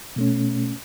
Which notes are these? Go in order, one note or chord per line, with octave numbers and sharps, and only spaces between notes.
B2 A3 C#4